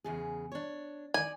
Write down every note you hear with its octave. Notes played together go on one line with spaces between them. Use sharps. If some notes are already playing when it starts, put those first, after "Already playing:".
E2 C#3 G#4
D4 C#5
D#3 D5 G#5